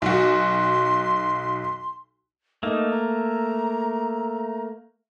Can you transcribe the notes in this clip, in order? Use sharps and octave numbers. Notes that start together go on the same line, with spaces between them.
B1 F#4 C6
A3 A#3 D#4
A#5